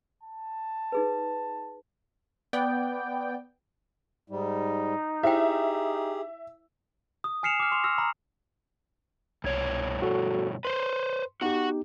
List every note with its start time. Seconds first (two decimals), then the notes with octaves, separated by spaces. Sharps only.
0.23 A5
0.92 D#4 G#4 B4
2.53 B3 D5 G5
4.30 G#2 G3 D#4
5.23 E4 G4 G#4 C5 E5 G5
7.24 D#6
7.43 G#5 F6 C7 C#7 E7 F7
7.60 D6 F6
7.72 C6 C#6 F7
7.84 E6 F6 A#6
7.98 A#5 B5 E6
9.44 C2 G2 B2 C#5 G#6
10.02 F#4 A4
10.65 B4 C5 C6
11.41 B3 D#4 F#4 G4 F#5